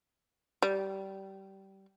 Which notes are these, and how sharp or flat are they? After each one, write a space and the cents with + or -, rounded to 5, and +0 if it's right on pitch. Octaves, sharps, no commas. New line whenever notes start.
G3 -20